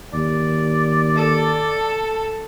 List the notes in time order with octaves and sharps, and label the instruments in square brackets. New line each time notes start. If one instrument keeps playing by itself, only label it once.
[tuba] D#2 [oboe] D5
[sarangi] A4